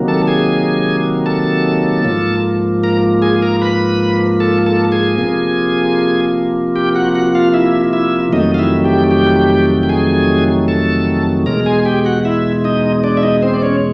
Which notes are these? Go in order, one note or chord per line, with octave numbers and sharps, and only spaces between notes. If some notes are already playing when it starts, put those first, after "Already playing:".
Already playing: C3 D#3 F#3 A#3
A4 A5
G#4 G#5
A4 A5
G#2 F3 A#3
A#4 A#5
G#4 G#5
A#4 A#5
B4 B5
A4 A5
A4 A5
G#4 G#5
C3 F3 A#3
G4 G5
F#4 F#5
F#4 F#5
F4 F5
E4 E5
E4 E5
F2 C3 D#3 F#3 A3 D#4 D#5
F5
E4 E5
G4 G5
G4 G5
G5
G#4 G#5
A4 A5
E2 B2 G#3 A#4 A#5
G#4 G#5
G4 G5
F#4 F#5
E4 E5
D#4 D#5
D4 D5
E5
D#4 D#5
C4 C5
D5
C#4 C#5